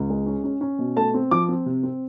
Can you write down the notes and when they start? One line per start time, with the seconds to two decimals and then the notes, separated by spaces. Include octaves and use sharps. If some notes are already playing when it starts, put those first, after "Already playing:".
Already playing: C#2
0.10 G#3
0.26 C#4
0.44 C#4
0.61 C#4
0.79 B2
0.96 A3 A5
1.14 C4
1.31 F3 D6
1.49 C4
1.66 C3
1.83 C4